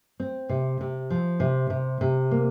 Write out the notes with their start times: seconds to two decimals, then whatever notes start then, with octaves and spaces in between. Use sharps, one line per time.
0.20 C4
0.49 C3
0.81 C3
1.10 F3
1.40 C3
1.70 C3
2.01 C3
2.31 A#3